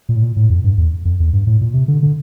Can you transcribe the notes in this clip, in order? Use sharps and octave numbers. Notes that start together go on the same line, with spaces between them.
A#2
A2
A#2
A2
F2
G2
E2
F2
E2
G2
A2
A#2
C3
D3
D3